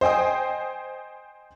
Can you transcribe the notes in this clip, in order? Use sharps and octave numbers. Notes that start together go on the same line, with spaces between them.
C5 D#5 G5 G#5 D#6